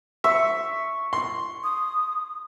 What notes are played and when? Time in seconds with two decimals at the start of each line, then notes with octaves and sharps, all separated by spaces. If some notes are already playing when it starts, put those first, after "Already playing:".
0.24 E5 C#6
1.13 C6
1.64 D#6